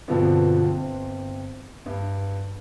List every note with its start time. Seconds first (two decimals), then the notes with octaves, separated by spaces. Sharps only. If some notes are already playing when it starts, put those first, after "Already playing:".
0.08 G2 B2 D3 F3 C4
0.63 G1 C4
1.86 G2